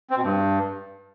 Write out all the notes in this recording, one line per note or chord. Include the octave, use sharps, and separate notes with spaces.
C4
B2
G2